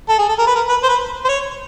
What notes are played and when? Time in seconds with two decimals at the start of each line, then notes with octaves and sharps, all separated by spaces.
0.09 A4
0.19 G#4
0.29 A4
0.39 A#4
0.47 B4
0.55 A#4
0.69 B4
0.84 C5
0.89 B4
1.25 C5
1.29 C#5